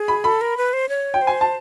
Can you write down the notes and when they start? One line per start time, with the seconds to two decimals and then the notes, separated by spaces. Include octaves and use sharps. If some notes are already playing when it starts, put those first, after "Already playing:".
Already playing: G#4
0.08 B5
0.24 A4 B5
0.41 A#4
0.57 B4
0.73 C5
0.89 C#5
1.14 G5
1.21 C5
1.27 G#5
1.41 A5